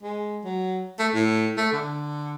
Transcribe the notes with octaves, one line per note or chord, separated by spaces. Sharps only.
G#3
F#3
A3
A2
A3
D3